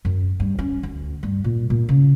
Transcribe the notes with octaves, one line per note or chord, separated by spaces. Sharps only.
F#2
G2
C#4
D2
G2
A#2
A#2
C#3